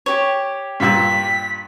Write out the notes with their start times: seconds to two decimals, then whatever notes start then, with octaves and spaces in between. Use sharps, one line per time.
0.06 G4 C#5
0.80 G2 A#2 E6 B6